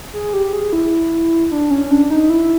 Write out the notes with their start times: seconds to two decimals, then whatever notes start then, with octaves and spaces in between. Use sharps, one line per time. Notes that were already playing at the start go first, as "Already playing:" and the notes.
0.13 G#4
0.33 G4
0.53 G#4
0.73 E4
1.51 D4
1.71 C#4
1.91 D4
2.10 D#4
2.30 E4